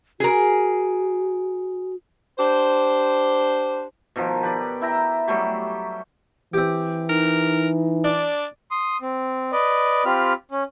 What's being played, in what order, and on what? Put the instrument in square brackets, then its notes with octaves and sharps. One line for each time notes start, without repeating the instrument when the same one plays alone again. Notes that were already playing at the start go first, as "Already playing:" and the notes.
[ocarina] F#4 [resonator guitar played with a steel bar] G#4 A#4
[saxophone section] D4 G4 C5
[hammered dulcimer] B2 D#3 F3
G4 B4 D5
E4 E5 G5 A#5
F#3 G3 A3 G4
[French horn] E3 [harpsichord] C4 G4
[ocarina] D#4 [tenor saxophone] A#4
[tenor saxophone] D4 [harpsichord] D5
[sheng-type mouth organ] C6 D#6
C4
B4 D5 D#5
C4 F4 G4 B5 F6
C#4